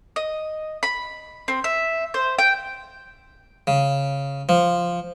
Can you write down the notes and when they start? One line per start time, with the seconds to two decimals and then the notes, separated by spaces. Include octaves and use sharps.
0.16 D#5
0.83 B5
1.48 C4
1.64 E5
2.14 C5
2.39 G5
3.67 C#3
4.49 F3